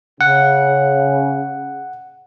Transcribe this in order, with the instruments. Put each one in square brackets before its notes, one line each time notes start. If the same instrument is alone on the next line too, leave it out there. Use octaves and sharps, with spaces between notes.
[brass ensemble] C#3 [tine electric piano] F#5